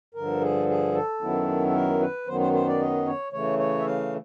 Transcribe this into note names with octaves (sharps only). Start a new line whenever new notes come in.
G2 D3 F3 A#4
G#4
G#4
A4
F#2 D#3 F#3 B3 E4
A4
A#4
B4
F#2 D#3 F#3 B3 C5
C5
C5
D5
D#5
C#5
C#3 E3 A3 C#5
C#5
E5
F5